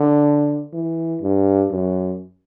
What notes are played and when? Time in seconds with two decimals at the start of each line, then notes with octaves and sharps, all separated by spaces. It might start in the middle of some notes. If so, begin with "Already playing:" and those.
Already playing: D3
0.73 E3
1.22 G2
1.71 F#2